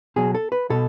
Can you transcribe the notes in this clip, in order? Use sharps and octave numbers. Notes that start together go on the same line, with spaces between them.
B2 F#3 G#4
A4
B4
B2 A4